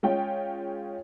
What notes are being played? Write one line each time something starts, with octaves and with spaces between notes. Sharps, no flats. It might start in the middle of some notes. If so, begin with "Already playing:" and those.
G#3 C#4 F4 G5